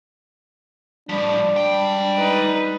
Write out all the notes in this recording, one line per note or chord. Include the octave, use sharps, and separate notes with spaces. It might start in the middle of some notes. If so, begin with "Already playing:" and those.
A2 F3 G3 D4
G#3 G5
D#4 B4